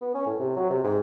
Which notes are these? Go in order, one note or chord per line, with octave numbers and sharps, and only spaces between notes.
B3
C#4
A2
C3
F#3
C3
G#2